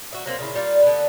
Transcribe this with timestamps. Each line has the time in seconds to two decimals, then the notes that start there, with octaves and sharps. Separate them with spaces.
0.13 F#4 E5
0.26 F#3 A#3 C4
0.39 A#2 C#3 E4
0.55 G3 A#3 F4
0.82 D3 B3